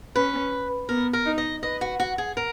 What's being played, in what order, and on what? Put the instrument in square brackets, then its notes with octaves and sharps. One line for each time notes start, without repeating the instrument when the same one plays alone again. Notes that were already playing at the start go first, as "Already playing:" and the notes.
[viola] C#4 [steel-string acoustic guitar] B4
[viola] B3 [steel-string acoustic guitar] A#4
[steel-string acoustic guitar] A#4
[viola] D#4
[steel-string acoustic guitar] D#5
[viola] B4 [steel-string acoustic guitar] D#5
[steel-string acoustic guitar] F#4
F#4
G#4
A#4